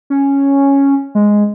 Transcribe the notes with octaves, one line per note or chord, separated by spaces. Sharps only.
C#4
G#3